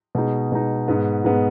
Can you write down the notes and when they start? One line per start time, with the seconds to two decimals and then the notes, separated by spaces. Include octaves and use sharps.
0.15 B2 G#3 D#4
0.52 B2 G#3 D#4
0.88 G#2 G#3 B3
1.25 G#2 G#3 B3